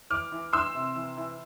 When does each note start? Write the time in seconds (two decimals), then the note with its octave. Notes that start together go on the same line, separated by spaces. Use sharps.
0.10 E3 D6 F6
0.32 E3
0.53 E3 C6 E6
0.75 C3
0.96 E3
1.17 E3